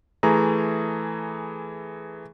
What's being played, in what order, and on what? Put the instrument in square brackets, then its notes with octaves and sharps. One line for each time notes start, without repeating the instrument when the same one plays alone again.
[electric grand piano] E3 A3 G#4 A#5